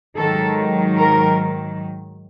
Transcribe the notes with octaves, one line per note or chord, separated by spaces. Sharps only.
G#2 D#3 F#3 A4
A#4